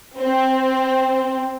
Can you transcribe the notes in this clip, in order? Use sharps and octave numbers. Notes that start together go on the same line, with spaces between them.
C4